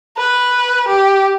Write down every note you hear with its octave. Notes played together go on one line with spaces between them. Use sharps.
B4
G4